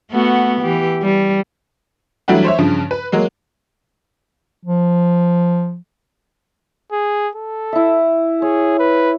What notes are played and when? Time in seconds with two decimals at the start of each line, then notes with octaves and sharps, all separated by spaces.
0.11 A3 B3 F#4
0.61 E3 G4
1.02 G3
2.28 E3 F#3 G3 A3 D4 F#4
2.44 C5 C#5 E5
2.58 G2 C#3 F3
2.91 B4
3.12 F#3 G#3 A#3
4.65 F3
6.92 G#4
7.35 A4
7.73 E4 E5
8.42 G#4 C#5
8.79 B4